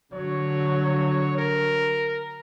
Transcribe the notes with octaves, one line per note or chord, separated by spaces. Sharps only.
D3 F#3 C#5
A#4